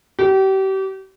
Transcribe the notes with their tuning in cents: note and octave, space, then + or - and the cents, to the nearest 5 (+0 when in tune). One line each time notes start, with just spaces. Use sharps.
G4 -35